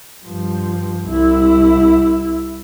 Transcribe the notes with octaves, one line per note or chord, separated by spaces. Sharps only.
G2 F3
C2 E4